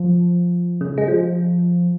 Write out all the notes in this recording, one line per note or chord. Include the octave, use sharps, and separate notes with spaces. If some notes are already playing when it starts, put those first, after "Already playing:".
Already playing: F3
C#3
G#3
F3